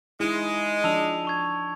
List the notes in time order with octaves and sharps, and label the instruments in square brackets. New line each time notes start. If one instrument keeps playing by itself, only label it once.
[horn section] G#3 [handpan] D#4 E4
[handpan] F3 D4 D5 [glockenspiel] A5 E6 F7
[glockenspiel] A5 C#6 G#6